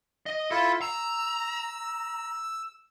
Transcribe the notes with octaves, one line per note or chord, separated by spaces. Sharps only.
D#5
E4 F4 A4 E5
A#5 E6